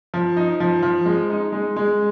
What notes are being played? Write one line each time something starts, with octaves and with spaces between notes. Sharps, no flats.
F3
D#4
F3
F3
G#3
D#4
G#3
G#3